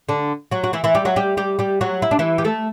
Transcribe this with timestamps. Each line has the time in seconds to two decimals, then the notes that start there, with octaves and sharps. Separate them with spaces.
0.09 D3 D4
0.51 F#3 F#4
0.64 F#4
0.73 E3 E4
0.84 E3 E4
0.95 G3 G4
1.05 F#3 F#4
1.16 G3 G4
1.37 G3 G4
1.59 G3 G4
1.81 F#3 F#4
2.02 E4
2.11 D4
2.19 E3 E4
2.38 G4
2.44 A3 A4